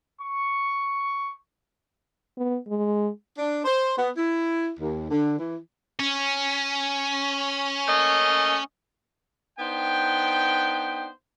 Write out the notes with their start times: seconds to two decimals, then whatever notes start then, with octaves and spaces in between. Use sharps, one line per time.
0.19 C#6
2.37 B3
2.68 G#3
3.37 D4
3.64 C5
3.96 B3
4.16 E4
4.80 D#2
5.11 D3
5.38 E3
6.00 C#4
7.86 A3 A#3 D#5
9.59 B3 D4 D#4 C5 G5